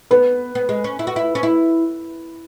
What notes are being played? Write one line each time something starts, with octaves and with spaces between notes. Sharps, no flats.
B3 B4
B3
G#3
C#4
E4
F#4
E4
C#4
E4